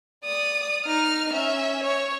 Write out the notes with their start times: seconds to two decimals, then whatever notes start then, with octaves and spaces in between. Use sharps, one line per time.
0.25 D5 D#6
0.85 D#4 F6
1.33 C#4 E5
1.84 C#5